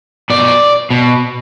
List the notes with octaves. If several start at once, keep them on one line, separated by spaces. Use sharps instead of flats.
B2 D5
B2